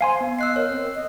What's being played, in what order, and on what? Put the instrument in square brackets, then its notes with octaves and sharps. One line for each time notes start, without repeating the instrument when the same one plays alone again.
[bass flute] C5 [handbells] F5 G#5 C6
[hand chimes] B3
[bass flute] D#5 [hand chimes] E6 F#6 C7
[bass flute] A#4 [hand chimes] C#5
[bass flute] C4
D#5